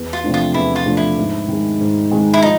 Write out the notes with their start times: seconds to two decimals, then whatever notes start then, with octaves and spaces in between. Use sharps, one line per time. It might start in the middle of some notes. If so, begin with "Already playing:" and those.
Already playing: E2
0.13 F4
0.24 C3 F3 A3 D4
0.34 F4
0.54 E2 E4
0.76 F4
0.86 C3 F3 A3 D4
0.97 E4
1.18 G#2
1.48 D#3 G#3
1.81 G#2
2.11 D#3 G#3
2.34 E4
2.42 F3 D#4